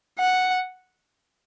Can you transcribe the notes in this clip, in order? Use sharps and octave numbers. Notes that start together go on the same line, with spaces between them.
F#5